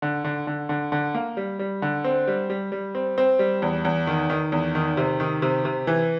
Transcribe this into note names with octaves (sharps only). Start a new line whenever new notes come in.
D3
D3
D3
D3
D3
A#3
G3
G3
D3
C4
G3
G3
G3
C4
C4
G3
E2
E2
D#3
D#3
E2
D#3
C3
D#3
C3
C3
E3